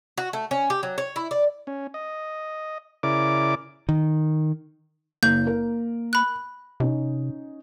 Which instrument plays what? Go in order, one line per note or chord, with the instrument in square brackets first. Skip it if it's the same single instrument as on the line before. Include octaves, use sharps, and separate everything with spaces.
[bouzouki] F#4
A3
C#4
G4
F#3
C#5
E4
D5
[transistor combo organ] C#4
D#5
C#3 E4 A#4 D5 D6
[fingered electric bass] D#3
[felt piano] F#1 [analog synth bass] A#3 [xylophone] G6
[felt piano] A#4
[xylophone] B5 F#6
[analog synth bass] C3 [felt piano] C#4 D#4